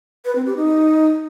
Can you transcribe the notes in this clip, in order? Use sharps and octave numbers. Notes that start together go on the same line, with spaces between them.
B4
C4
G4
D#4